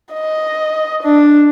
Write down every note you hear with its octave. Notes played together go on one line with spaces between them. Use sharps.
D#5
D4